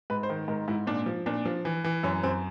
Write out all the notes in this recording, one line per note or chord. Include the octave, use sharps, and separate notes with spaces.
G#2 B4
C5
D#3
G#2 A#4
G#2 E4
A#2 D4
F3
A#2 D4
F3
E3
E3
F#2 C#4
F#2 C4